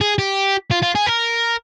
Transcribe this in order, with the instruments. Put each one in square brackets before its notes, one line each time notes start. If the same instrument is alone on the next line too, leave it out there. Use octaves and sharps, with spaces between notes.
[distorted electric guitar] G#4
G4
F4
F4
G#4
A#4